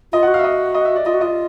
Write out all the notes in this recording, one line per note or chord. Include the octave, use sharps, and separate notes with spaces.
F4 D#5
F#5
F#4
F5
E5
D#5
D#5
E5
D5
F4 D#5
F#4
F4 D#5